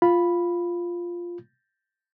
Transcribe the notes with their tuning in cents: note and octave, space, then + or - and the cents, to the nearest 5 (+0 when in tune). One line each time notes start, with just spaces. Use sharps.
F4 +0 B5 +0